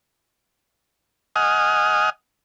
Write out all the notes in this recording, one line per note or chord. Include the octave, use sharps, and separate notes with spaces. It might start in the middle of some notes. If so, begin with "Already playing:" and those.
D#5 F#5 G#5 D#6 F6